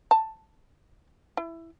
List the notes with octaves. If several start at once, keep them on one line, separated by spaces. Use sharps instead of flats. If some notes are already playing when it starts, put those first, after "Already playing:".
A5
E4